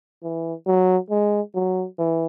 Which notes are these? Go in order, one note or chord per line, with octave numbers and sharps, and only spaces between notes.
E3
F#3
G#3
F#3
E3